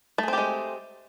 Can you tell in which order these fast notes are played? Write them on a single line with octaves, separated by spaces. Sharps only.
A3 G#4 C4 G4 G#3